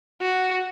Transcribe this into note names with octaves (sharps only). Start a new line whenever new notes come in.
F#4